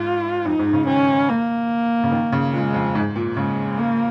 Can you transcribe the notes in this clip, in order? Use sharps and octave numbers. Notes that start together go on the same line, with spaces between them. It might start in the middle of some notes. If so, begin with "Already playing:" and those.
Already playing: G#2 F4
F2 D#4
G#2
C#3
D#3 C#4
A#3
C#3
D#3
C#3
A#2 G#3
F2
G#2
A#2
C#3 G#3
A#3